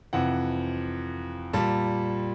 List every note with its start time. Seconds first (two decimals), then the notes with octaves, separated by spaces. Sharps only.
0.13 F2 C3 E3 F#5
1.53 A#2 G3 A5